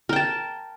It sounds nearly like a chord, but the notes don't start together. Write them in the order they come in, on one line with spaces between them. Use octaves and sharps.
A#4 G5 A5